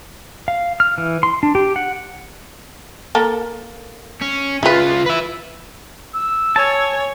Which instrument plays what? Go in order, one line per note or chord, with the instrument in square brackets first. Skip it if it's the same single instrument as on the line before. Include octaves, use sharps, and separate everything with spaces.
[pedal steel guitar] F5
F6
E3
C6
D4
G4
F#5
[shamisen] A#3 A4 A#4
[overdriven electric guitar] C#4
[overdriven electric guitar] C#2 F4 [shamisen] E4 B4
[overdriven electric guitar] B4 E5
[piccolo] E6
[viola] C#5 [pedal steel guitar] G#5 A5